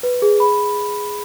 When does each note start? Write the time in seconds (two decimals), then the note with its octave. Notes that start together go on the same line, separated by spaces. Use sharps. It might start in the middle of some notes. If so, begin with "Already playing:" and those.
0.03 B4
0.22 G#4
0.40 B5